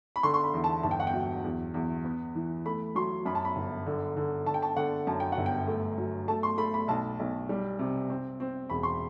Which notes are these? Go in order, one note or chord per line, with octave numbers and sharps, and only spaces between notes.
B5
D3 C6
C6
B5
E2
A5
G1 A5
G5
F#5
G5
F#3
E2
E2
B3
E3
A3 B5
F#3 C6
F#2 B5
A5
B5
G1
D3
D3
D3 A5
G5
A5
D3 F#5
F#2 A5
G5
G1 F#5
G5
A3
F#3
A3 A5
C6
A3 B5
B5
B1 A5
B1
G3
C3
C4
C4
E1 B5
C6